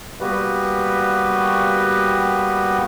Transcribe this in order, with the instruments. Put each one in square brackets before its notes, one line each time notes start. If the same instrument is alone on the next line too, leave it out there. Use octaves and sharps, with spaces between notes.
[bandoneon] G3 A#3 B3 F#4 G4 B4